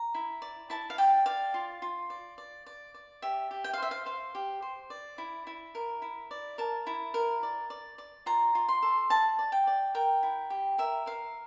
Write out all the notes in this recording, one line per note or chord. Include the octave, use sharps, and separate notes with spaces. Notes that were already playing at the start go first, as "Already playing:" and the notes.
Already playing: A#5
E4
D5
E4 A5
F5
D5 G5
D5 F5
F4
F4
D5
D5
D5
D5
G4 E5
G4
G5
F5
C5 E5
F5
C5 F5
G4
C5
D5
E4
E4
A#4
E4
D5
A#4 A5
E4
A#4
D5
D5
D5
F4 A#5
F4
C6
A4
D5 A5
D5
G5
D5
A#4 G5
E4
G4
A#4 E5
A#4 F5